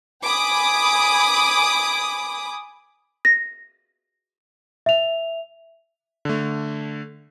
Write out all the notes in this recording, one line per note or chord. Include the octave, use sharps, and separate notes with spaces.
G#5 B5 D6 D#6
A#6
E5 F7
D3 A3